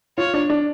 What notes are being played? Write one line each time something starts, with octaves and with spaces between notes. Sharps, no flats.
F4 C#5
D4
D4